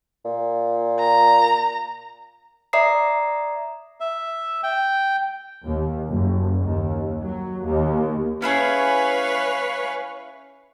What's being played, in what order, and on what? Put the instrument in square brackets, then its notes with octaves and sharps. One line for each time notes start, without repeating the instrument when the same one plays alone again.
[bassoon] A#2
[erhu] A#5
[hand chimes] D5 E5 A#5 D#6 C7
[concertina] E5
G5
[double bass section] D#2
F#1
D#2
F#3
D#2
[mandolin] C#4 E4 G#4 [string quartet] B4 C#5 F5